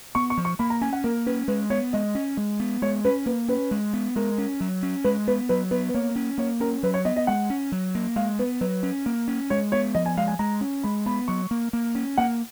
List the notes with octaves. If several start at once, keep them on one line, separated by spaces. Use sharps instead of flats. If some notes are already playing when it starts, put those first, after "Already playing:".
B3 C#6
C#6
F3
C#6
A#3 B5
A#5
C#4 G#5
F#5
A#3 A#4
C#4 B4
G#3 B4
B3 C#5
G#3 D#5
C#4
G#3
B3
G#3 C#5
C#4 B4
A#3 B4
C#4 B4
G#3
B3
G#3 A#4
C#4
F#3
C#4
G#3 B4
B3 B4
F#3 B4
B3 B4
B4
A#3 C#5
C#4
A#3 C#5
C#4 A#4
F#3 B4
C#5
B3 D#5
D#5
G#3 F#5
C#4
F#3
A#3
G#3 F5
B3 B4
F#3 B4
C#4
A#3
C#4
G#3 C#5
B3 C#5
F3 D#5
G#5
G#3 F5
G#5
G#3 A#5
C#4
G#3 B5
B3 B5
F#3 C#6
A#3
A#3
C#4
A#3 F#5